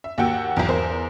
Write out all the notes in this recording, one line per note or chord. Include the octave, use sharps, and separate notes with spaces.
E5
D#2 A#3 F#4 F#5 G5 E6
B1 E2
E2 A#4 C5